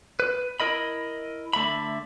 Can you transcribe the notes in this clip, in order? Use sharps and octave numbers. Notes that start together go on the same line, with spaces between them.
B4
E4 A#4 D#5 B5
D3 A3 E5 B5